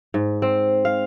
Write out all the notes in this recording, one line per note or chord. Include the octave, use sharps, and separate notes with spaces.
G#2
C4
F5